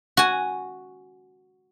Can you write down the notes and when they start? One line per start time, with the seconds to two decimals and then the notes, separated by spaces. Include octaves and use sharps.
0.17 F#4 G#5